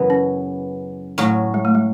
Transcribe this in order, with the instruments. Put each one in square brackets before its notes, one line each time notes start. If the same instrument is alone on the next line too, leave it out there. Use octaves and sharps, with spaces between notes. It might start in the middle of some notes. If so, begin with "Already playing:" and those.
Already playing: [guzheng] F#2 C#3 E3 B3
[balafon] C#4
[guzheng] A2 F#3 C#4 [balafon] A3
[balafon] G#3
A3
G#3